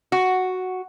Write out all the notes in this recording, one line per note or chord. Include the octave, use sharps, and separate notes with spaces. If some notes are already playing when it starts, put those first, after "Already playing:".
F#4